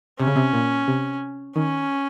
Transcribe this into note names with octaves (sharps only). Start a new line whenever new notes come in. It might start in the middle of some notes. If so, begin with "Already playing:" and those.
C3 C#4
C#3
C3
A#2
C3
D#3 C#4